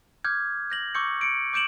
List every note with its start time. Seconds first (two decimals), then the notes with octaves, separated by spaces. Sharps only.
0.24 D6 F6 G6 G#6
0.70 G6 A#6 F#7
0.95 C#6 D6 E6 G6 C#7
1.21 C#7 D7
1.53 D6 G6 D7 E7 F#7